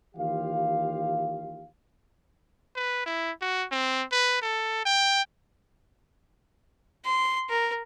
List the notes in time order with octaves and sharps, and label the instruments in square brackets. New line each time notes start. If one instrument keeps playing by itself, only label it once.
[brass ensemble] D#2 E3 F4 G4 F5
[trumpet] B4
E4
F#4
C4
B4
A4
G5
[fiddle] C6
A#4